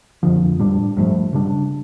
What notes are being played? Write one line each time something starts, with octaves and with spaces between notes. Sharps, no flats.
F2 D3 F3
A2 G3 D4
G2 F3 A3
C#3 G3 D4